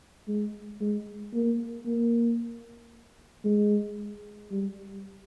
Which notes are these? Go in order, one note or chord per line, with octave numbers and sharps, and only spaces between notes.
G#3
G#3
A#3
A#3
G#3
G3